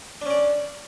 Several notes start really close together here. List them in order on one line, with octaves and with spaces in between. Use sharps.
D4 C#4 D5